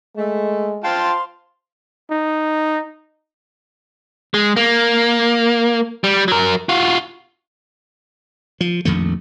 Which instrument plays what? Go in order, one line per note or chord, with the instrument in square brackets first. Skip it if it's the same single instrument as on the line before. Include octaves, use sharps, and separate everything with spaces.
[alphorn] G#3 [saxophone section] A3
[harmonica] F4 G5 A5 [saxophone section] C5 F5 [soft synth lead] C6
[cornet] D#4
[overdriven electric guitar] G#3
A#3
G3
F#3 A#4
F4 F#4
[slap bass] F3
A#1 F2 D#3 A3